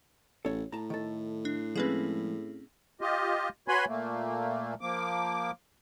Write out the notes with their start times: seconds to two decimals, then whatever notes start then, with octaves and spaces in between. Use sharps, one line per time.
0.45 A1 A4 C#5
0.72 A2 A5 A#5
0.90 D#3 A4
1.45 D4
1.76 F3 G#3 C4 C#4 G#4 B4
3.01 F4 G4 D#5
3.68 F#4 B4 C#5 G#5 B5 C6
3.88 A#2 A3 A#3
4.81 F3 A#3 D6